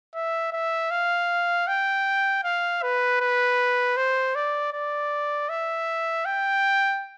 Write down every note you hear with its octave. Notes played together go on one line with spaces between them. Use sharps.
E5
E5
F5
G5
F5
B4
B4
C5
D5
D5
E5
G5